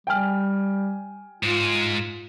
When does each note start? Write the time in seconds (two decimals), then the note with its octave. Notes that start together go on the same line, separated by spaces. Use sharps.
0.07 G3 G5 G#5 F6
1.43 G#2 F4